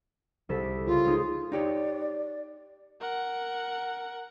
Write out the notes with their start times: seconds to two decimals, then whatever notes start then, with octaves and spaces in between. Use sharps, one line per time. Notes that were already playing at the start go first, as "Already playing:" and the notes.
0.49 C2 A4 B6
0.63 D6
0.86 C#2 F4
1.06 G#3 D#4
1.52 D#4 G4 C#5 D5
3.01 A#4 F#5